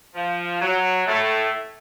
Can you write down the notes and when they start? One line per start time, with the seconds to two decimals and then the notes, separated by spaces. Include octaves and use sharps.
0.15 F3
0.61 F#3
1.07 A2 A3